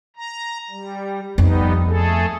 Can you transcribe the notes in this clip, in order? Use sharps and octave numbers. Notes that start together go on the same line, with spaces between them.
A#5
G3
F2 G3 B3 D#4
A3 G#4 A4